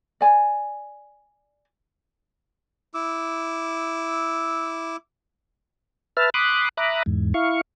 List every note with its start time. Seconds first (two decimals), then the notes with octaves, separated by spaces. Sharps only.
0.21 D5 G#5
2.94 E4 D6 E6
6.17 B4 E5 A5 F6
6.34 B5 C6 D6 D#6 F#6
6.77 E5 A#5 B5 D6 D#6 F#6
7.06 E2 G#2
7.34 E4 F5 C#6